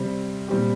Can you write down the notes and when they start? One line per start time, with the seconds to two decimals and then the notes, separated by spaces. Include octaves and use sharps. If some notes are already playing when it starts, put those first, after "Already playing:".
Already playing: C3 G3 C4
0.48 A#2 G3 C4 G4